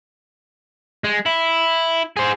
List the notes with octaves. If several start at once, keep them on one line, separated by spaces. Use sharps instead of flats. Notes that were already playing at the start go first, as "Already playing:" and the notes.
G#3
E4
G#4 C5